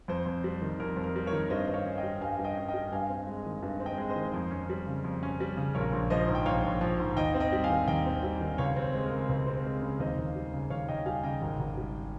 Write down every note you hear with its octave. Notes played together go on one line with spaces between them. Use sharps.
F2 C5
F2
G3
D#3
F2 A#4
F2
A#4
G3
A#4 C#5
D#3
G2 C5 D#5
G2 D#5
C#5 F5
C#4
D#5 G5
G3
G2 F5 G#5
G2
D#5 G5
C#4
D#5 G5
G3
G2 F5 G#5
C4
G#3
D#3
G2
C4
D#5 G5
G#3
C5 D#5
D#3
F2
C#4
G3
C#3
F2
C#4
G3
C#3
A#1 A#4 C#5
A#1
F3 C5 D#5
G#2
G5
A#1 C#5 F5
A#1
F3
G#2
D#2 D#5 G5
C4
D#5 G5
G3
F5 G#5
D#3
D#2 D#5 G5
C4
G3
D#3
C#2 C#5 F5
C4
C5
G#3
A#4
C#3
C#2 C5
C4
G#3
C#3
D#2 C5 D#5
D#2
G3
C#3
D#2 C#5 F5
D#2 D#5 G5
G3 F5 G#5
C#3 D#5 G5
G#1
G#1
G3